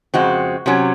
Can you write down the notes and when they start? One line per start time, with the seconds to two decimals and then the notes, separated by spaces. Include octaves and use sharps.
0.14 F2 C#3 G#3 C4 F#4
0.66 C3 F#3 C#4